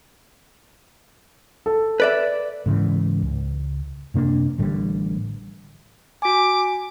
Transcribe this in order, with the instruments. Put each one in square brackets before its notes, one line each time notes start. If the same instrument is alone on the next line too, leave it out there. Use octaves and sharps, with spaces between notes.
[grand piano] A4
[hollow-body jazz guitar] B4 D5 E5
[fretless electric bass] G#2 C#3 E3
C#2
F#2 C3 A#3 D4
A1 A2 D3 G3
[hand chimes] F#4 G#5 [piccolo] D6